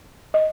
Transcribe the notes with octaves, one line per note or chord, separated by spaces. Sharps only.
D#5